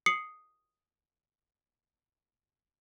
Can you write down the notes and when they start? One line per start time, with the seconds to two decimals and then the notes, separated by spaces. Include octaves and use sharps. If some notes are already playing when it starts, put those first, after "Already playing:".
0.06 D#6 C7 C#7 F#7